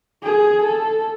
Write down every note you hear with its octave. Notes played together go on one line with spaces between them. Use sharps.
G#4
A4